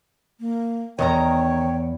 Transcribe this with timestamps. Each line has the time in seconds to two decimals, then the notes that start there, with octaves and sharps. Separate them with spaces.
0.40 A#3
0.99 E2 D#3 C#5 D#5 G5 A#5